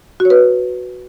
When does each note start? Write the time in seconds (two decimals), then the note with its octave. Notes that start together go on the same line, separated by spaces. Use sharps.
0.20 F#4
0.25 C#5
0.30 B4